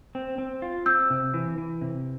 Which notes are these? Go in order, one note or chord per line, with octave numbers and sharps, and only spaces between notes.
C4
C4
F4
C4 E6 G6
C3
E3
E3
C3